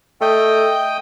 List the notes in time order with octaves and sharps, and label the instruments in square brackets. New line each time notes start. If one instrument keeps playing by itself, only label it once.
[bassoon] A3 [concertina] D#5 G5